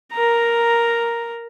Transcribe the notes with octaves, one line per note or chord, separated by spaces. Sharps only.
A#4 A#5